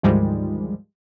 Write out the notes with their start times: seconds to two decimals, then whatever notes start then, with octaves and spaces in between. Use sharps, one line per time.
0.03 D2 G#2 D#3 F3 G3 G#3